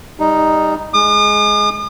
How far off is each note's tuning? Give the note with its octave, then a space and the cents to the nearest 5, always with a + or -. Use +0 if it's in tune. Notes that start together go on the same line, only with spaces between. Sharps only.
G3 +20 D#4 +0
G#3 +10 D#6 -45